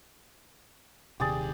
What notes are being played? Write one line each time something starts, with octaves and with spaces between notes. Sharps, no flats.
D#1 C3 D#3 G4 G#4 D5